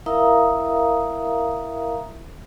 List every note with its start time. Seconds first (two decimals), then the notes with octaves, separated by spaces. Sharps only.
0.06 E4 A#4 E5 F5 A#5 D#6